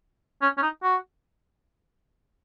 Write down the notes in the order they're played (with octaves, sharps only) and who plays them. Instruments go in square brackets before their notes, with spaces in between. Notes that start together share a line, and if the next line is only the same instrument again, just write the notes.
[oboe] C#4
C#4
D#4
F#4